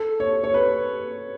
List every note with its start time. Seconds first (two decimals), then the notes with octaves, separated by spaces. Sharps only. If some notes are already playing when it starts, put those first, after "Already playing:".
Already playing: A4
0.20 C#5
0.44 C#5
0.54 B4